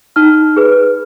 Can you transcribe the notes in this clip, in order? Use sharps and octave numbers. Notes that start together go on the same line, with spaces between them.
D#4 F6
G#4 B4